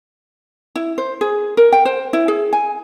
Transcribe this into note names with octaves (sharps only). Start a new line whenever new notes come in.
E4
C5
G#4
A#4
G5
C5
E4
G#4
G#5